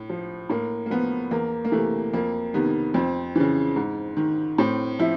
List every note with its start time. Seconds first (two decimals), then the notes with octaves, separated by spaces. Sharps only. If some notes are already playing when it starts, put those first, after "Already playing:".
Already playing: A2
0.09 F3
0.49 A2 A#3
0.86 A#3
0.90 F3 B3
1.31 E2 A#3
1.65 A#3
1.72 C3 E3 A3
2.13 F2 A#3
2.54 C3 D#3 B3
2.94 F2 C4
3.36 C#3 E3
3.76 G#2
4.17 D#3
4.58 A2 C4
4.99 F3 E4